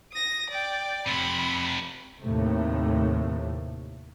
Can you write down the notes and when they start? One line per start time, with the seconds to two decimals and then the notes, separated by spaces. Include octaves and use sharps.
0.12 D#6 A#6
0.49 D5 G5
1.07 F2 C3 B5
2.21 D#2 A2 C3 A3